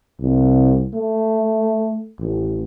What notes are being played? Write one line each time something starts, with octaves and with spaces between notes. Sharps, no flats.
C2
A3
A1